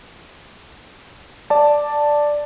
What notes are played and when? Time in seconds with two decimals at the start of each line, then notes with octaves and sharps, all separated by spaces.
1.50 D5 A5